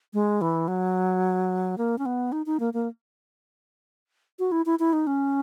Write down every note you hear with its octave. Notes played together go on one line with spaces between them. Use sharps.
G#3
E3
F#3
A#3
C#4
B3
D#4
D#4
A#3
A#3
F#4
E4
E4
E4
D#4
C#4